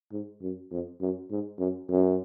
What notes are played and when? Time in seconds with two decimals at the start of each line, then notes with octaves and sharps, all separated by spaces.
0.12 G#2
0.42 F#2
0.71 F2
1.01 F#2
1.31 G#2
1.59 F#2
1.89 F#2